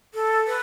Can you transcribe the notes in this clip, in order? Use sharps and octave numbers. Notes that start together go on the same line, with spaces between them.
A4
B4